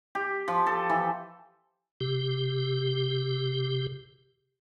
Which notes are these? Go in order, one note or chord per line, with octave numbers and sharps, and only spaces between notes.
G4
F3
A4
E3
C3 G4